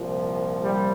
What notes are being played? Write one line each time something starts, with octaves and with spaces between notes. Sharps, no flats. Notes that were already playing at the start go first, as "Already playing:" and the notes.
Already playing: C2 A#2 F3
G3